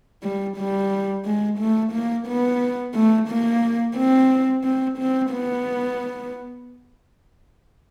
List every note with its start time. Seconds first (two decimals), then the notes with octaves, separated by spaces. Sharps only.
0.23 G3
0.57 G3
1.25 G#3
1.59 A3
1.93 A#3
2.27 B3
2.95 A3
3.29 A#3
3.96 C4
4.64 C4
4.98 C4
5.32 B3